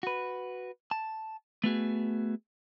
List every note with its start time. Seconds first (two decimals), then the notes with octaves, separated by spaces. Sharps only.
0.03 F#4 B4
0.91 A5
1.64 A3 B3 F#4 G#4